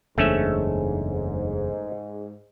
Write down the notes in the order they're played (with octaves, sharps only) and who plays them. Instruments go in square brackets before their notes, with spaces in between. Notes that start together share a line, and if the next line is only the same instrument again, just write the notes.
[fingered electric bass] F#1 E2 D4 [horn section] G#2 [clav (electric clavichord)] A3 C#4 E5